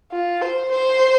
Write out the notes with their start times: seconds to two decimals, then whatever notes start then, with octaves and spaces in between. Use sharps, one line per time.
0.12 F4
0.42 C5
0.71 C5